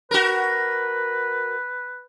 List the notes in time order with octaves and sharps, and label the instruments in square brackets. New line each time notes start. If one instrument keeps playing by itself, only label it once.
[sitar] F#4 A#4 [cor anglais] B4